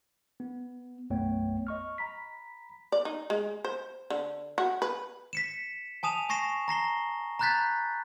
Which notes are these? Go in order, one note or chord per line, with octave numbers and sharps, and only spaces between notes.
B3
B1 F#2 A3 B3 C#5 G5
D#5 C#6 F6
A#5 B5 B6
D5
D#4
G#3
C5
D3
F#4
B4
B6 C#7 E7
G#5 A5 D#6 E7 F7
G#5 C#6 A#6 C7 E7
A#5 A#6 C7 G7
A#5 B5 F#6 G6 A6 B6